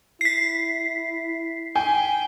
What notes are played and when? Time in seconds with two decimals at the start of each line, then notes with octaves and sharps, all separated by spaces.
0.21 E4 B6 C7
1.76 G5 G#5